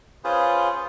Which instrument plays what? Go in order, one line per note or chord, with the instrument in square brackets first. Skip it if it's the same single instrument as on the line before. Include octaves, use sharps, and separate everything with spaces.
[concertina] C#4 F4 G#4 B4 C5